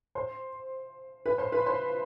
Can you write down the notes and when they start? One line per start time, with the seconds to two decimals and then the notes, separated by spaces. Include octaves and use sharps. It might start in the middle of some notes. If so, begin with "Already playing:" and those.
0.15 C5 C6
1.26 B4 B5
1.38 C5 C6
1.52 B4 B5
1.66 C5 C6